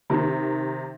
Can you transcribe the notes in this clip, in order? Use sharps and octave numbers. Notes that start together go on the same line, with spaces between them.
C3 D#3